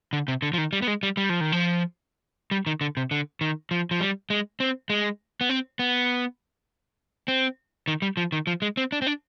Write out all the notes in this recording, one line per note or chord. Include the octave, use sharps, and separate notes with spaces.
D3
C3
D3
F3
D#3
G3
B3
G#3
G3
G3
F3
D#3
F3
G3
D#3
D3
C3
D3
D#3
F3
F3
G3
G#3
C4
G#3
B3
C4
B3
C4
D#3
G3
F3
D#3
F3
G#3
C4
D4
C4
D4